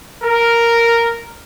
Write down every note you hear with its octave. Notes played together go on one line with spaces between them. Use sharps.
A#4